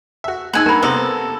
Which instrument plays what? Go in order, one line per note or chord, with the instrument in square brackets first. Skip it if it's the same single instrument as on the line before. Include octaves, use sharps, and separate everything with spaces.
[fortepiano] F#4 E5
[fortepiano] G#3 E6 [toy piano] D#4 A#5 [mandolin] F#5 G#5
[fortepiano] G2 A#3 [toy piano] A#4 B5
[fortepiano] C3 A#3 B3 [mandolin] A4 [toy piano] A#4 C5 C6